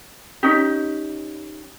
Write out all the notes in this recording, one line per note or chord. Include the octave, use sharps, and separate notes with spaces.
C#4 D#4 G4